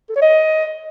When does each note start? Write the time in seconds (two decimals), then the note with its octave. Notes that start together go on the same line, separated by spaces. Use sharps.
0.09 A4
0.16 C#5
0.22 D#5